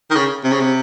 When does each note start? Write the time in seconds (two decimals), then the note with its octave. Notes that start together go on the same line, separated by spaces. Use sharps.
0.11 D#3
0.16 C#3
0.44 C3
0.52 C#3
0.60 C3